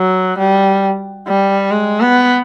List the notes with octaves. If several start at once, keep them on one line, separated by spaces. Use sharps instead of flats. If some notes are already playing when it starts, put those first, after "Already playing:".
Already playing: F#3
G3
G3
G#3
B3